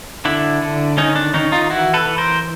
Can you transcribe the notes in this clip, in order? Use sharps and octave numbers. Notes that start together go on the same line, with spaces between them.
D3 D4 E4
D3
D#3 C#4 D#4
D4
D#3 C#4 D#4
D#4 F4
E3 E4 F#4
A4 B4
E3
A#4 C5